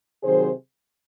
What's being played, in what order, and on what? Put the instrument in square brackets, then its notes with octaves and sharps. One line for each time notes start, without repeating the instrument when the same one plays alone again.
[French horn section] C3 D#3 F#3 G#4 C5